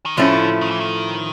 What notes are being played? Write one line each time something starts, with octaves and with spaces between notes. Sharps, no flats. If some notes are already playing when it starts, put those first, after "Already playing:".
D#3
A2 D3 F3 A3 C#4 E4
D#3
E3
D#3